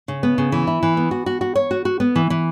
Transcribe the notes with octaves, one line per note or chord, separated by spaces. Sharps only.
C#3
B3
C#3
E3
E4
E3
B3
F#4
F#4
F#4
C#5
F#4
F#4
B3
E3
E3